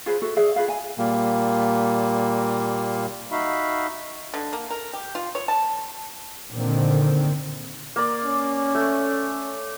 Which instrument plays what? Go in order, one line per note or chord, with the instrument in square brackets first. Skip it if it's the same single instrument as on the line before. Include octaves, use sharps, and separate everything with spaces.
[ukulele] F4 G#4 B4 C5
F#4 A4 E5
G#4 D5 E5
F4 G#4 B4 F5
G#5
[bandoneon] A#2 G3 A#3
[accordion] D#4 F#4 E5 F5 B5
[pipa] D3
A#3
A#4
G4
F4
C#5
A5
[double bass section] A#2 D3 D#3 C4
[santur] A#3 D5
[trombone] C#4
[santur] A3